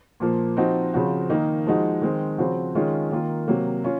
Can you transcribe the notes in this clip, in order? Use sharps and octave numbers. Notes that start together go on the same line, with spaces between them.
A#2 F3 A#3
F3 C4 D#4 F#4
C#3 F3 C4 F#4
D#3 A#3 D#4
F3 G#3 D#4 F#4
D#3 G#3 C4
C#3 F3 C4 F#4
D#3 G#3 C#4 F4
D#3 A#3 F4
C3 F#3 A#3
C#4 F4